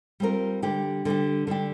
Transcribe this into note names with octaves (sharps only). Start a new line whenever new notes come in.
G3 C4 F4 A#4
D3 G3 D4 G4
D3 G3 D4 G4
D3 G3 D4 G4